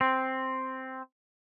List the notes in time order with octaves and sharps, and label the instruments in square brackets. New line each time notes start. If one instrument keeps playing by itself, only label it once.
[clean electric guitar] C4